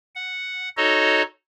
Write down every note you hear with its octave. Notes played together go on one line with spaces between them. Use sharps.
F#5
D#4 F#4 A4 C#5 D#5